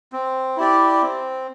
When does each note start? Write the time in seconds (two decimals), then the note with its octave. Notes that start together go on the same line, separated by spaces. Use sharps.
0.13 C4
0.57 E4 G4 D5
1.02 C4